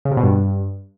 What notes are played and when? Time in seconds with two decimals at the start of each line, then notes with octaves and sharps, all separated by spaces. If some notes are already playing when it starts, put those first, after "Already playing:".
0.05 C#3
0.11 C3
0.17 B2
0.23 G2